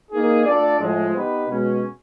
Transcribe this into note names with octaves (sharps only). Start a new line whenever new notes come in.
A#3 D#4 G#4
A3 D4 F4 A4 D5
A2 F3 G#3
B3 D#4 G4 B4
B2 G#3 C#4